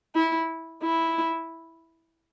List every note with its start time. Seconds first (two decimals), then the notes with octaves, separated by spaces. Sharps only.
0.15 E4
0.82 E4